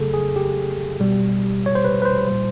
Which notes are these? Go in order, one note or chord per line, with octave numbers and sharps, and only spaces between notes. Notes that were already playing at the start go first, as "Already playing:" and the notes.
Already playing: F2 C#3 F#3 A3 G#4 A4
G#4
G4
B2 G3
C#5
C5
B4
B4
C5
A#2 G3